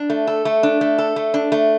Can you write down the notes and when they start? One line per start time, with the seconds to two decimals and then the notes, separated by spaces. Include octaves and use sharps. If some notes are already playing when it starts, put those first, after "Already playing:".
Already playing: D4
0.10 A3
0.27 A4
0.45 A3
0.63 D4
0.81 A3
0.98 A4
1.16 A3
1.34 D4
1.52 A3